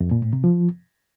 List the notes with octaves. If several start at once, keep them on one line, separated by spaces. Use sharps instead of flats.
F2
A#2
A2
C3
F3